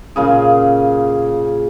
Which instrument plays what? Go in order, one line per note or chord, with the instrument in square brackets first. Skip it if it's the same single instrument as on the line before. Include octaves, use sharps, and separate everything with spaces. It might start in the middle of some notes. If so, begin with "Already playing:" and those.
[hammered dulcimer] A#2 C#3 G#4